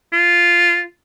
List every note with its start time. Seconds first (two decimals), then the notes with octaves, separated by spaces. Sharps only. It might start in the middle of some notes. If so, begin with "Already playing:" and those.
0.13 F4